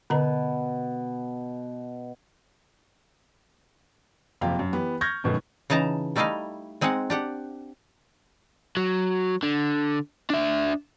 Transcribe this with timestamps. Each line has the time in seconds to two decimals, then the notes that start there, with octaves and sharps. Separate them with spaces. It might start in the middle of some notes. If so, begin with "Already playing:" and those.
0.10 B2 D3 A#5
4.41 F#1 F2 C3 F5 G5
4.59 F#2
4.73 E3 B3 G4
5.01 C#6 F6 G6 G#6 A#6
5.24 F#2 B2 D#3 A3
5.70 C#3 E3 D#4 A5 A#5
6.16 G3 A3 D#4 E4 D#5 F5
6.81 G#3 C4 D#4 G#4 F#5
7.10 D4 G4 F#5
8.77 F#3
9.43 D3
10.30 D4 E5